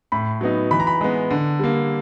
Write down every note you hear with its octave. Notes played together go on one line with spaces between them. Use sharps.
A2 B5
F#3 B3 D#4
E3 B5
A#5
B5
G#3 B3
D3
G3 A#3